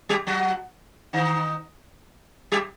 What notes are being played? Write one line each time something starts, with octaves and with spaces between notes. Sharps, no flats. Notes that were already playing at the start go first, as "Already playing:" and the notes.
G3 G4
F#3 F#4
D#3 D#4
G3 G4